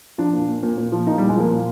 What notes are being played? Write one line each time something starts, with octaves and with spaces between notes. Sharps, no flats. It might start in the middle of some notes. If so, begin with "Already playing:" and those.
F3 D4
A#2
A#2
A#2
A#2
F3
A#2 D#4
G3
A#2
G#3
F3 A#3
A#2